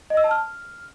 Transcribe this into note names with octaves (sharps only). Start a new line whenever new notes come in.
D#5
E6
A5
F6